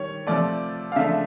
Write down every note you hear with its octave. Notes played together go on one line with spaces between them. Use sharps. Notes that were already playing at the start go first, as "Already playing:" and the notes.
Already playing: D#3 G3 C#5
C3 F3 A3 D5
F5
C#3 F3 A3 D4 E5